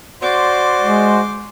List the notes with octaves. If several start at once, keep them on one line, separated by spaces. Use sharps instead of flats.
F#4 C5 D5 C6 D6
G#3